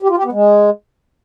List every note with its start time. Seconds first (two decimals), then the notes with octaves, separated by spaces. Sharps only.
0.02 G4
0.10 F4
0.17 G4
0.25 B3
0.32 G#3